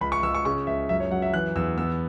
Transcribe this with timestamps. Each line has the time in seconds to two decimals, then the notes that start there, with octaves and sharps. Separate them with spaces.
0.01 C#2 B5
0.12 C#6
0.23 C#2 E6
0.35 C#6
0.45 C#3 C#6
0.67 C#2 E5
0.89 F#2 E5
1.00 C#5
1.11 F#3 F#5
1.22 E5
1.33 E3 F#6
1.56 E2 E6
1.77 B3 E6